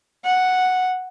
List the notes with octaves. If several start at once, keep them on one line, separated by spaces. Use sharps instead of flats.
F#5